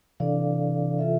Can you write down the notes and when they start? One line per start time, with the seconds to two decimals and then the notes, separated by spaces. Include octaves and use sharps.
0.20 C3 E3 D4 A4 D5 F5
0.99 F4 A4 E5